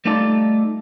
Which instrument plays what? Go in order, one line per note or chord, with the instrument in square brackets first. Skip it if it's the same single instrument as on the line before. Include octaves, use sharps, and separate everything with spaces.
[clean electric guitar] G3 A3 D#4 F4 A4 D5